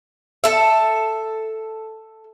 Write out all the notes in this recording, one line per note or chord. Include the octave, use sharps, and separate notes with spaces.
A4 E5